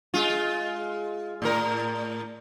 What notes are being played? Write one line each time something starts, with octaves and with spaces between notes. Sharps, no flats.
G#3 F4
A2 A#4